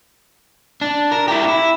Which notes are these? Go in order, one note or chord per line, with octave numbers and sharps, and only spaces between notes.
D4
A#4
E4 G4
E4